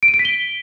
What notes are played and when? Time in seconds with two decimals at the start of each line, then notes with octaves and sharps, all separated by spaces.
0.03 D7
0.08 D#7
0.14 D7
0.19 B6
0.25 G7